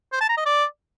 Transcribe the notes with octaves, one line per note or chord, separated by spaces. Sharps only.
C5
A5
A#5
D#5
D5